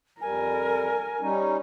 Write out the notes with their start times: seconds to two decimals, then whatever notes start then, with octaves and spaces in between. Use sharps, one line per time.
0.21 F2 G3 A#4 G#5
1.21 G3 C#4 D#4